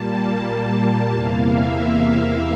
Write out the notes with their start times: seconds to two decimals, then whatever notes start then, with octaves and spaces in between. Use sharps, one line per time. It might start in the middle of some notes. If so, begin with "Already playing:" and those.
Already playing: A#2 G3 A#3 A5
1.10 E2 C3 E3 A#3 F5
1.43 E5